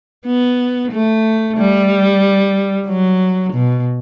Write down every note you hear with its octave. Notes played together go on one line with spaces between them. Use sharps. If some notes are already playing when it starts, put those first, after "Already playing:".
B3
A3
G3
F#3
B2